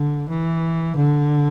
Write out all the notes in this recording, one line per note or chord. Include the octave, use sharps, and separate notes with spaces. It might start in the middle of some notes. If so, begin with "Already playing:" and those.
Already playing: D3
E3
D3